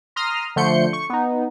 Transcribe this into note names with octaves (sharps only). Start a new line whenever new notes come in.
A#5 C6 D#6 F6
D3 F3 A3 C6 G6 C#7
C#6
B3 D#4